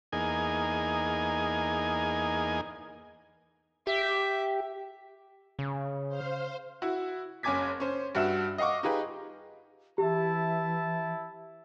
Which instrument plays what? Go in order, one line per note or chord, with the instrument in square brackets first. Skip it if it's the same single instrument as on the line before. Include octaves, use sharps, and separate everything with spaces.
[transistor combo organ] E2 A#3 D#4 G#4 G#5
[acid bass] G4 [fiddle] E5
[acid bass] C#3
[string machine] C5 F5
[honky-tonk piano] E4 F#4
F#1 C#4 G#5 D6 G#6 B6
C#4 C5
G2 F#4 E5 E7
D#5 F5 F#5 C#6 D6
D#4 F4 G4 G#4 B4
[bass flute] E3 [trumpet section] E4 E5 A5 [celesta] G4